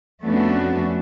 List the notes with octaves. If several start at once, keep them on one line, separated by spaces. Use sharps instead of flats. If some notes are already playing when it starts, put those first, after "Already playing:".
F2 A3 B3 C#4 D4 F#4